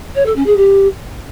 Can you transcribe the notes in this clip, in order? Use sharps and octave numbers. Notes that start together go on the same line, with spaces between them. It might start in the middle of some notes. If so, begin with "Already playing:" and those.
C#5
A4
C#4
G#4
G4